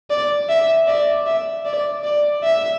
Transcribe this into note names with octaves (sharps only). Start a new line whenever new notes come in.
D5
E5
D5
E5
D5
D5
E5